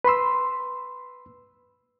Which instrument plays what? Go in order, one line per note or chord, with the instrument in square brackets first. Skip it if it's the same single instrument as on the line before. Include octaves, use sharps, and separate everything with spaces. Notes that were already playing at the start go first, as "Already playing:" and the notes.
[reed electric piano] B4 B5 C6 E6